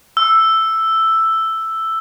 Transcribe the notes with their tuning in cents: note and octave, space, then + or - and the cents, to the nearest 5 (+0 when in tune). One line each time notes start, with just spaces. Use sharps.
E6 +5